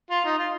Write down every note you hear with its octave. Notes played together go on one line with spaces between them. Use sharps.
F4
D#4
F4